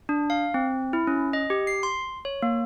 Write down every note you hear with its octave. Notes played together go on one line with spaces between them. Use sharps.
D4
F5
C4
E4
C#4
D#5
G4
C7
C6
C#5
A#3